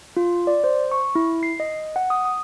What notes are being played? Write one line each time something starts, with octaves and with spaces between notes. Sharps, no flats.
F4
D5
C5
C#6
E4
C7
D#5
F#5
D#6
D#6